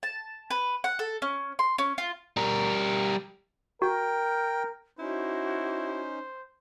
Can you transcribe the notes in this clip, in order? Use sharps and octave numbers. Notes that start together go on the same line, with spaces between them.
A5
B4
F#5
A4
C#4
C6
C#4
F4
G3 A#4
F#4 A#4 G5
C#4 D#4 E4 F#4 C5